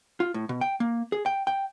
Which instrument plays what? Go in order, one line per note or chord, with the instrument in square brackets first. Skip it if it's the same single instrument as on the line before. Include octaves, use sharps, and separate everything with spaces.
[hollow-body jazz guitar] F4
A2
B2
G5
A#3
G#4
G5
G5